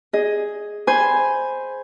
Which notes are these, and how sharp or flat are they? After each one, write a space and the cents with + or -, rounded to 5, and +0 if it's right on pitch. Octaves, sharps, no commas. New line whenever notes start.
G#4 +0 D#5 +10
C5 +0 G#5 +0 B5 +5